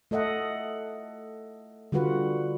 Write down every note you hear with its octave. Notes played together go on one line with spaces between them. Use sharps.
A3 A4 D#5 E5 F#5
D3 G3 F4 F#4 B4 F#5